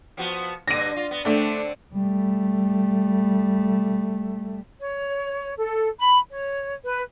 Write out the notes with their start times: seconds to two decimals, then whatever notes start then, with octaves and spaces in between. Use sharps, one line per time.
0.17 F3 B3 F#4
0.68 G2 D3 A#6 D#7
0.96 F4
1.11 B3
1.25 D3 A3 C4 D4
1.94 G3 A3
4.79 C#5
5.57 A4
5.98 B5
6.29 C#5
6.84 B4